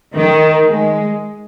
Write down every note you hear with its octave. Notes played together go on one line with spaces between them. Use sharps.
D#3
G#3